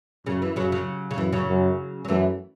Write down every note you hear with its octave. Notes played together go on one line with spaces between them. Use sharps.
F#2 C#3
E3
F#2 C#3 F#3
C#3 F#3
C#3
F#2 E3
C#3 F#3
F#2
F#3
F#2 E3 A3